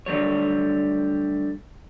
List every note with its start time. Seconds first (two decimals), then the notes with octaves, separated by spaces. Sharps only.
0.06 D2 D3 F#3 G3 C#5